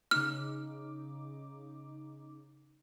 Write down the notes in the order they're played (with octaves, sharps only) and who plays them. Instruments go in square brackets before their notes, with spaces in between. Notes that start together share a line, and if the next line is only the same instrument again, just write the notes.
[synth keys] C#3 D#4 D6 [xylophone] F6